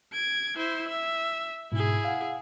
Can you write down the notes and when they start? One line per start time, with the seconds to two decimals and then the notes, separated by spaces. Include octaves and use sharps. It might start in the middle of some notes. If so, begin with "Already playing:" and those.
0.13 G#6 D7
0.57 E4 C5
0.88 E5
1.72 G#2 B2 E4 G#4
2.05 F5 F#5